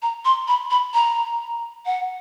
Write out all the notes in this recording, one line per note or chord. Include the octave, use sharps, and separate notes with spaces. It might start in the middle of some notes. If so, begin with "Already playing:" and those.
A#5
C6
B5
B5
A#5
F#5